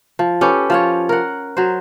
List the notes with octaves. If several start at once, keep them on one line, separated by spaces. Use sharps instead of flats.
F3
C#4 G4 A4 B4
F3 F4 C#5
A#4 F#5
F#3 C5